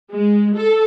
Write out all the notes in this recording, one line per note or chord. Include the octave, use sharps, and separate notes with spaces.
G#3
A4